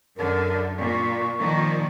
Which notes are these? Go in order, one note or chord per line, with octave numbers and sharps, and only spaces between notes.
F#2 D3 A#4
A#2 C#6
A#2 D#3 F3